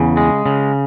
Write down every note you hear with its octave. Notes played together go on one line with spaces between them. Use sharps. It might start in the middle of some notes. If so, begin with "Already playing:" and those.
Already playing: E2 C#3
G#3
C#3